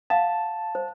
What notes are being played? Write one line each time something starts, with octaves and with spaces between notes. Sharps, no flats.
F5 F#5 A5
C5